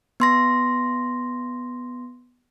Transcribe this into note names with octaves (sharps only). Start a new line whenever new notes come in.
B3 C6 A#6